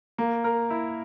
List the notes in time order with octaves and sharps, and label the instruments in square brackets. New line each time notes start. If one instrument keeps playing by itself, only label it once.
[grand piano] A#3
A#4
E4